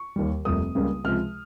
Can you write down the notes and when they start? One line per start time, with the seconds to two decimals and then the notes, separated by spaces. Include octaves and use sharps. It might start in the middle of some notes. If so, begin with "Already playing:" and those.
Already playing: C#6
0.16 D#2 D#3 G3
0.45 F1 F2 C3 G3 A#3 D#6
0.75 C#2 C#3 G3 A#3
1.04 C#2 C3 F3 G#3 F6